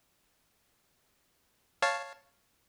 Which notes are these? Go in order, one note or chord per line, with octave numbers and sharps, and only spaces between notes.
C#5 F5 A5